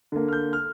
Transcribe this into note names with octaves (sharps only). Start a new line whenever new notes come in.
D3 A#3
F6
G6
F6